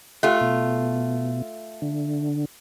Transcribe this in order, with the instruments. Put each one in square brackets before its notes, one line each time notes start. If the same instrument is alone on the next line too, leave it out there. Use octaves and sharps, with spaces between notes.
[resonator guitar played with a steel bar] A3 F4 [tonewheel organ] G4 F#5
[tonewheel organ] B2
D3